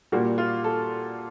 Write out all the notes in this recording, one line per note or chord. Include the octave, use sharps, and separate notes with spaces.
A#2 G3 A#3 F#4
F4
A4